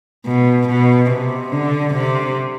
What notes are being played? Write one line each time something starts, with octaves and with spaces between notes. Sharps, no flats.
B2
B2
C3
D3
C3